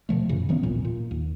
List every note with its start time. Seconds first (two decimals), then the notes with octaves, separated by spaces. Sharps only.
0.09 B2 D3 F3 A3
0.29 F#2 A#2 C#3
0.49 E3 F#3 B3 C#4
0.63 D#1 A1 A#2
0.85 A#2
1.11 D#2